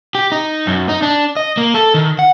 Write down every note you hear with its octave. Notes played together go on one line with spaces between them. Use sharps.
G4
D#4
F#2
D#4
D4
D#5
A#3
A4
D#3
F#5